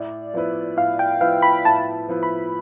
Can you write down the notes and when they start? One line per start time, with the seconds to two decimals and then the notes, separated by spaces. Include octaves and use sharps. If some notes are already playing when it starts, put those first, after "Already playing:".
Already playing: A2 D5
0.34 F3 B3 E4 B4
0.77 A2 F5
0.99 G5
1.21 F3 B3 E4 B4 F5
1.42 B5
1.65 A2 A5
2.08 F3 B3 E4 B4
2.23 B5